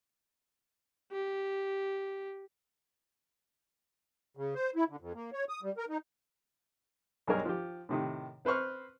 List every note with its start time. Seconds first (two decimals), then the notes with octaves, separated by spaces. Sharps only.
1.12 G4
4.37 C#3
4.55 C5
4.76 E4
4.89 D3
5.01 F2
5.15 A#3
5.33 C#5
5.49 D#6
5.63 G3
5.77 A#4
5.89 D#4
7.27 B1 G2 D4 G#4 A#4 C#5
7.45 F3 G4
7.89 A2 C3 D#3
8.45 C4 B4 C5 C#6 F6